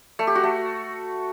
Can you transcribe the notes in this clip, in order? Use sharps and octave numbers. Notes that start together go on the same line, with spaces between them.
A3
G4
F#4
A3